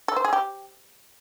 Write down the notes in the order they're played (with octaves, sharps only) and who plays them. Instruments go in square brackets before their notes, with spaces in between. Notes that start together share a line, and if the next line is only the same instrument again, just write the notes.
[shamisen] A4
C5
G#4
G4